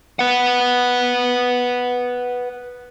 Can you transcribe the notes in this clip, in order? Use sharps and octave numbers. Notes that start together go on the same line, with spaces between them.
B4 F#5